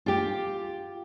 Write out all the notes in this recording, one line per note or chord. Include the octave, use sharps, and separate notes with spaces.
F4 G4